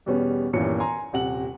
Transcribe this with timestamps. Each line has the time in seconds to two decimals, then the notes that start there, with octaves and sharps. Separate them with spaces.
0.06 E2 B2 G3 B3 C#4
0.53 G1 D#2 A#2 E3 C#4 C#7
0.80 G#5 A#5 C6
1.13 D#1 C3 F#5 F#7